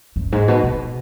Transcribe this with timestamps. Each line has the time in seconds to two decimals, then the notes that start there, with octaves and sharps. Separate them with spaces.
0.16 F#2
0.32 G#2
0.48 B2
0.63 B2